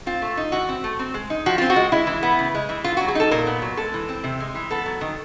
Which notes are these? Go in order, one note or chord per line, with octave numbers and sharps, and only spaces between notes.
C4 F4
A3
D#4
E3 F#4
C4
A3
C4
G#3
D#4
F3 F#4
C4 F4
F#4
G#3
G#3 E4
E3
B3
C#3
G#3
E3
B3 F4
F#4
F#3
G#4
D#4 A4
A#2 A#4
B3
F#3
G#3 A4
E3
C4
C3
G#3
E3
B3 A4
F#3
D#3